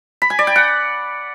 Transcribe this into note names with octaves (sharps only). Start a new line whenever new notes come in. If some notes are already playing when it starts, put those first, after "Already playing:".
B5
G#5
D5
G5
F#5